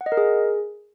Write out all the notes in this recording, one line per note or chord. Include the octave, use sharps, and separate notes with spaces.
F#5
D#5
A#4
G#4